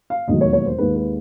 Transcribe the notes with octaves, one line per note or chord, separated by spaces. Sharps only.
F5
E1 D#2 D#3 F#3 A3 D#5
C#5
C#5
C5
D#2 D#3 G#3 B4
B4